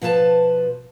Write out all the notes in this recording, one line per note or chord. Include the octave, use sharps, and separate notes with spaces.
B2 F3 B4 C5 A5